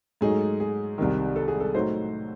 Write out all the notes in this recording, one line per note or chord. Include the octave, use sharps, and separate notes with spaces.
G#2 F#3 A3 D#4 G#4
G#4
C2 C3 D#3
A4
G#4
A4
A2 F#3 A3 D#4 C5